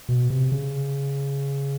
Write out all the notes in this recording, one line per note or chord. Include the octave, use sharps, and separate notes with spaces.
B2
C3
C#3